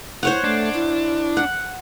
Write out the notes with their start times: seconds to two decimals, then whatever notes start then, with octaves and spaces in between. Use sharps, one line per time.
0.23 E4 C5 C#5 F#5
0.44 A3 D4
0.74 E4
1.37 F#5